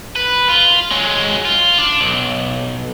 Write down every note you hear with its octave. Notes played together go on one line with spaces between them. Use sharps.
B4
F4
F#3 G#3
F4
D4
B1